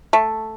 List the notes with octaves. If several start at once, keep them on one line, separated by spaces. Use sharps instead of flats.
A3